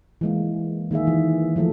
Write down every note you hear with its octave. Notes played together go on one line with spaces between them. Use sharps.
E3 G#3 A#3
D#3 A#3 G#4 E5
E3
E3 F3 A3 A4